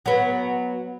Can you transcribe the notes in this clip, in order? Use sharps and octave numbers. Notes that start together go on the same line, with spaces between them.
F#3 B3